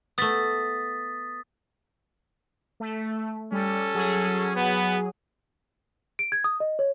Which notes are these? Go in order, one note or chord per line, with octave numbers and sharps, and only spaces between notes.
A3 B3 D#6 A6 B6
A3
G3 C#4 A4
F#3 G#4
B3
D7
G#6
D#6
D#5
C#5